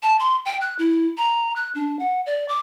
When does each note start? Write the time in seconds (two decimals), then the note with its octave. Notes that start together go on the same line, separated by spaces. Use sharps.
0.03 A5
0.20 C6
0.46 G5
0.61 F#6
0.79 E4
1.18 A#5
1.56 F#6
1.75 D4
1.99 F#5
2.26 D5
2.48 D6